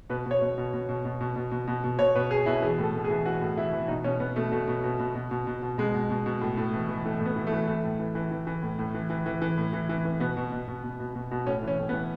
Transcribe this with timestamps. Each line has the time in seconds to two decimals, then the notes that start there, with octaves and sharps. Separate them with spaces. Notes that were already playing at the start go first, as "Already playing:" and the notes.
0.10 B2 B4
0.26 B2
0.31 C#5
0.41 B2
0.58 B2
0.73 B2
0.89 B2
1.05 B2
1.21 B2
1.36 B2
1.51 B2
1.67 B2
1.84 B2
1.99 B2 C#5
2.15 B2 B4
2.31 B2 G#4
2.46 B2 E4
2.62 E3 G#4
2.78 A2
2.83 A4
2.94 A2
3.04 G#4
3.10 E3
3.25 E3 F#4
3.41 A2
3.57 E3 E4
3.73 E3
3.88 B2 D#4
4.04 B2 C#4
4.20 B2 B3
4.36 B2 A3
4.52 B2 A3
4.68 B2
4.84 B2
4.99 B2
5.15 B2
5.31 B2
5.47 B2
5.62 B2
5.78 B2 G#3
5.94 B2
6.10 B2
6.26 B2
6.41 A2
6.57 A2
6.73 E3
6.89 E3
7.05 E3 A3
7.20 A2
7.26 B3
7.36 E3
7.47 A3
7.52 E3
7.67 E3 A3
7.84 A2
7.99 E3
8.15 E3
8.31 E3
8.47 E3
8.63 A2
8.79 A2
8.94 E3
9.10 E3
9.26 E3
9.41 E3
9.58 A2
9.73 E3
9.89 E3
10.05 E3
10.20 B2 B3
10.37 B2
10.52 B2
10.68 B2
10.83 B2
11.00 B2
11.15 B2
11.31 B2
11.47 A2 C#4
11.63 E3 C#4
11.78 A2
11.89 B3
11.94 E3